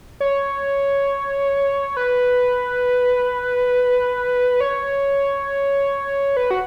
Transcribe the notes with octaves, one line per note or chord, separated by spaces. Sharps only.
C#5
B4
C#5
B4
F#4